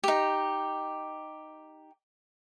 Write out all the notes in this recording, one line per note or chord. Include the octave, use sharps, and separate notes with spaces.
D#4 G4